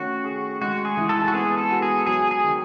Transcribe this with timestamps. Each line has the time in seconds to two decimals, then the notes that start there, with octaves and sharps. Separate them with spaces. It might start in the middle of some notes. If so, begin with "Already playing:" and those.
Already playing: D#3 A3 C#4 F#4
0.24 G#4
0.61 G#3 F#4
0.85 G#4
0.97 E3
1.09 A4
1.28 F#4
1.34 B3 G#4
1.58 A4
1.70 F#4
1.82 G#4
2.06 F#3 G#4
2.31 G#4
2.44 D#3